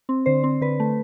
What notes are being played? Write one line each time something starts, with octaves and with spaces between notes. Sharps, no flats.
C4
D3 C5
C4
D3 B4
A3